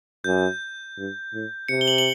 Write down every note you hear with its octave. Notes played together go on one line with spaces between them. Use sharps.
F#2 G6
G2
A2
C3 C#7
G7
F#7
F#7